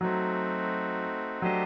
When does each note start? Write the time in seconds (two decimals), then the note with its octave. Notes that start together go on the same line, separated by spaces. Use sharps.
0.01 F#3 A3 C4 D#4 F#4
1.42 F#3 A3 D4 G4 C5 D#5